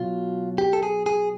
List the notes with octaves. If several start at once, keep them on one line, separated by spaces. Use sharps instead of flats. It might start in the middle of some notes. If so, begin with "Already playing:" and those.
Already playing: B2 F#3 F4
G4
A4
G#4
G#4